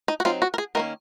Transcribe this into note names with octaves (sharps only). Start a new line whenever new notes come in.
D#4
F#4
F#3 C4 D#4 F4
F#4
A#4
G#4
D#3 A#3 C#4 A#4